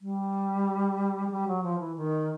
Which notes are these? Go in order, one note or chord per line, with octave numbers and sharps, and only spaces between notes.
G3
G#3
G3
F#3
F3
E3
D#3